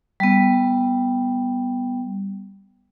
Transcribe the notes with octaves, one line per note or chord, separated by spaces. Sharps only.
G3 B3